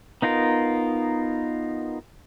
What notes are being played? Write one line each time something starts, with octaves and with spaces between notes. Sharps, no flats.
B3 D#4 F4 A#4